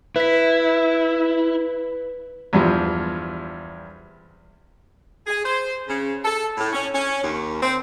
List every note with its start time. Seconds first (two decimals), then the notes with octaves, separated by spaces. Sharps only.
0.16 E4 B4 B6
2.53 E2 G2 F3
5.26 G#4
5.44 C5
5.88 C#3
6.24 A4
6.57 A2
6.73 C#4
6.93 C#4
7.23 D#2
7.61 C4